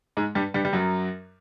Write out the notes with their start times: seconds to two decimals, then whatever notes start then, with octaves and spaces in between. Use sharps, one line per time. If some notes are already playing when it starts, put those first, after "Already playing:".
0.17 G#2 G#3
0.35 G2 G3
0.54 G2 G3
0.65 G3
0.73 F#2 F#3